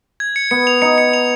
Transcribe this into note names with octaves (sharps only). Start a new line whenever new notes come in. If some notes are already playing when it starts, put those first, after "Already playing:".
G#6
C#7
B3 C#7
F7
D#4 C#7
C#7
F7